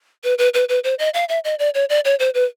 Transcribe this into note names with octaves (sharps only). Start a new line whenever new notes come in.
B4
B4
B4
B4
C5
D#5
F5
E5
D#5
D5
C#5
D5
C#5
C5
B4